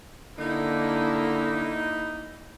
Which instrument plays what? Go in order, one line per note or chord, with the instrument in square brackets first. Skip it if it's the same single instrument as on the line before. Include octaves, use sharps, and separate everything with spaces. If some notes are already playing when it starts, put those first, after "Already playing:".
[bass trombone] D3 [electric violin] A#3 E4 [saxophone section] D#4